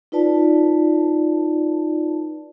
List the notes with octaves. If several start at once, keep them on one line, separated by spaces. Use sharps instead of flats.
D#4 F4 B4 D5 A5